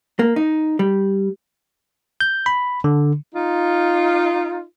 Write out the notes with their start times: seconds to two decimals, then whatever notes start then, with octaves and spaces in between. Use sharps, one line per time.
0.19 A#3
0.36 D#4
0.79 G3
2.21 G6
2.46 B5
2.84 D3
3.35 D#4 F4